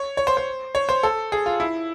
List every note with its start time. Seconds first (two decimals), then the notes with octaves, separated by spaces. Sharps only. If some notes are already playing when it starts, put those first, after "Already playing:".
Already playing: C#5
0.17 C#5
0.27 C5
0.37 C5
0.75 C#5
0.89 C5
1.03 A4
1.32 G#4
1.46 F4
1.60 E4